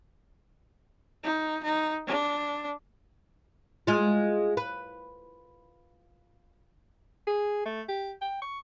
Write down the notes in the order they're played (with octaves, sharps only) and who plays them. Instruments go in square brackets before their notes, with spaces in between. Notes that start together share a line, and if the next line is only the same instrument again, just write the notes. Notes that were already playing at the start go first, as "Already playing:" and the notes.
[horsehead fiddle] D#4
D#4
D4
[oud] G#3 F4
B4
[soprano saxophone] G#4
A3
G4
G5
C#6